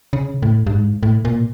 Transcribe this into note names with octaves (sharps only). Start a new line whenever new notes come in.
C#3
A2
G2
G#2
A2
A#2